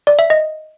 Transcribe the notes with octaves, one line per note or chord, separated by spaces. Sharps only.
D5
E5
D#5